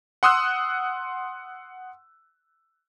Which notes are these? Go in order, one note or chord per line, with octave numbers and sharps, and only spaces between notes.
F#5 C6 D#6 E6 F#6